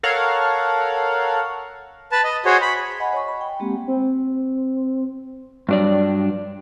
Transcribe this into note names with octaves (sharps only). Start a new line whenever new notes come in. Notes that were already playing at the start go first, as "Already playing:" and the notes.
A4 A#4 C#5 F5 F#5
B4 A5
D#5
F#4 G#4 C5 C#5
B5
D#5 F#5 G#5 B5
C#5 C#6
B5
G5
G#3 A#3 C4 G4
C4
G2 F#3 D4 D5